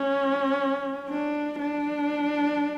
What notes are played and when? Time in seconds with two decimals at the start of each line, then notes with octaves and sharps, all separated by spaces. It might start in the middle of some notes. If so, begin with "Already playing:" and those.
Already playing: C#4
1.09 D4
1.59 D4